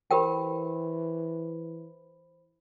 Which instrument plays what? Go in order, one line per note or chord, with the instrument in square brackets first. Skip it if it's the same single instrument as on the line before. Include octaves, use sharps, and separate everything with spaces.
[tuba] E3 [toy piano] G4 A#4 G5 [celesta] C5 B5